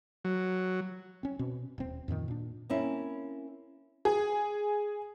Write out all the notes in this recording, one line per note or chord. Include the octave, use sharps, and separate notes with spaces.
F#3
C4 C#4
B2 C4
D#1 C4
F2 A#2 D3 D#3
A#2 D4
A#3 C4 C#4 E4
G#4